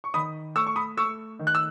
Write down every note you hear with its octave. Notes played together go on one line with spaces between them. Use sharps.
C#6
D#3 B5 D#6
A3 C#6 E6
C#6
B5 D#6
A3 C#6 E6
D#3
F#6
E6